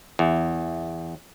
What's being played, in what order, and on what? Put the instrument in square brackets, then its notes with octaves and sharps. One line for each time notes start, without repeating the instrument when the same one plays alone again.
[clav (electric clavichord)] E2